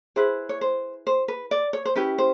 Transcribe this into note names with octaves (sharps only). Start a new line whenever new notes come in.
E4 G#4 B4 C5
C#5
C5
C5
B4
D5
C#5
C5
C#4 E4 G4 B4
C5